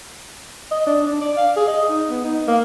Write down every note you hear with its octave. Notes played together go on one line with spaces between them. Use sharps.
D#5
D4
D4
D5
F5
G#4
D#5
D#4
B3
D#4
A#3